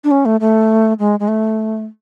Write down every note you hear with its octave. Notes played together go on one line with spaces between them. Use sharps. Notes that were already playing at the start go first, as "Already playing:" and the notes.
D4
C#4
A3
A3
G#3
G#3
A3